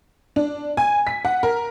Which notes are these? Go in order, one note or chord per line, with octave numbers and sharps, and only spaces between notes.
D4
G#5
B6
F#5
A#4